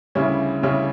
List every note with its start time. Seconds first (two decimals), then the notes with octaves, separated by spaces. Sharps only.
0.15 D2 C#3 G3 C#4 E4
0.63 D2 C#3 G3 C#4 E4